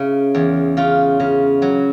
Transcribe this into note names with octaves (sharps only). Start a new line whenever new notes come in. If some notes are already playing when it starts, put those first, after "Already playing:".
Already playing: C#3 E4
E2
C#3 F4
C#3
F#3